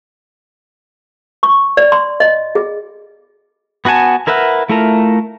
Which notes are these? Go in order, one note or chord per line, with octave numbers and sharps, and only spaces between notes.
C#6
D5
C6
D#5
G#4
B3 F#4 F#5 G#5 A5
E4 A#4 B4 E5 F#5
A3 E4 F4 A4 A#4